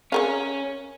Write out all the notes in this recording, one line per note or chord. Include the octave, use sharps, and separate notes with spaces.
C#4 G#4 A#4 F5